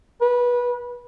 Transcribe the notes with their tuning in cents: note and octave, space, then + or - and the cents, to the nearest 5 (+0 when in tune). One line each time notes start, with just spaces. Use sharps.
B4 -20